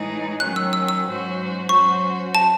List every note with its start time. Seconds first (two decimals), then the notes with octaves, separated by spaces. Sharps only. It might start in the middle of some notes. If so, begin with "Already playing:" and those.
Already playing: A2 E3 G#3 D#4 G#4
0.40 D#3 F#3 C#4 F#6
0.56 E6
0.73 E6
0.88 E6
1.05 G#2 F#3 C#4 F#4 C5
1.69 F#3 C#4 F#4 C5 C#6
2.35 A5